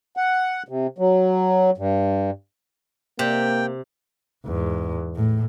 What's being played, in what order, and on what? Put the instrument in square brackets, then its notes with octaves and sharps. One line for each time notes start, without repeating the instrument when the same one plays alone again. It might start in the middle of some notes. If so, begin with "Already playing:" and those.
[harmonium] F#5
C3
F#3
G2
[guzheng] C3 [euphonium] A#3 [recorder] G5
[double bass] E2 G#2
A2